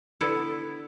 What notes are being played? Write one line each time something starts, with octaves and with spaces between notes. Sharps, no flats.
D3 B3 E4 A4